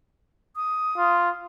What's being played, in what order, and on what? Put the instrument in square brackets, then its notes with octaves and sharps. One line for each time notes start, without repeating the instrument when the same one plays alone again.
[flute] D#6
[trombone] F4